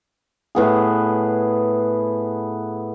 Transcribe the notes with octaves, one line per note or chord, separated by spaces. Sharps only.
A2 B3 G#4